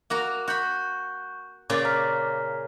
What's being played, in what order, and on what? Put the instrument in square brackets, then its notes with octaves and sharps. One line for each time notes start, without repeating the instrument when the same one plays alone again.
[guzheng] A#3 F#4 A#5
[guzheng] F#4 B5 [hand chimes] C#6 G6
[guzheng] A#2 C#3 C#4 [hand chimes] D6 A6
[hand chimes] A#5 F6 B6